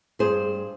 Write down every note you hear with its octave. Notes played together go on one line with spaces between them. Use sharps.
G2 G#4 C5